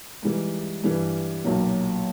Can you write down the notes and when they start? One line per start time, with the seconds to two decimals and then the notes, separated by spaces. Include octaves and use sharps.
0.23 G#2 E3 G3
0.83 G2 E3 G3
1.45 B1 A#2 F#3